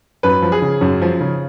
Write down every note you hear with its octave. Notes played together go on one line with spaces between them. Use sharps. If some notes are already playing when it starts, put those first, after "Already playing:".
F#2 B4
F3
G#4
C#3
F#2
F3
C#3